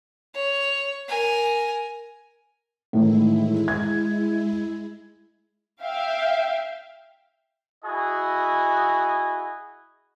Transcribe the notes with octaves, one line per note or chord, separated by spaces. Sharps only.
C#5
A#4 G#5
A2 D#3 E3 G#3 E4
G#6
E5 F5 G5
E4 F#4 G#4 D#5 G#5